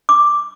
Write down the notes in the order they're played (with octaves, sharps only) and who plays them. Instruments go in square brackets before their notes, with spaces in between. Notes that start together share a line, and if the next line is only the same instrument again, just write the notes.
[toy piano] D6